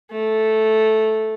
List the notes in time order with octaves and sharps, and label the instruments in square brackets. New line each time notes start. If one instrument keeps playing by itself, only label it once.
[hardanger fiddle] A3